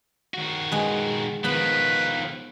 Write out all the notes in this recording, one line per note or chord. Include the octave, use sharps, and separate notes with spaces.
D#3 F#4
G#3 B4
D#3 F3 B3 B4 B5